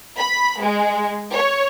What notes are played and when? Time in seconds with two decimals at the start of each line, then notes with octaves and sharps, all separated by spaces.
0.18 B5
0.62 G#3
1.32 C#5